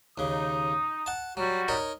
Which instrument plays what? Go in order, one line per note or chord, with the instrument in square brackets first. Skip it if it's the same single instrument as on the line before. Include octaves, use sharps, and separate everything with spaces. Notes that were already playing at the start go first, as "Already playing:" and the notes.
[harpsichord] D#2 C#3 [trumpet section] D#4 D#6
[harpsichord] F#5 A5
[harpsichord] F#3 [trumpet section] G3 F#4
[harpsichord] D#4 A#4 C#5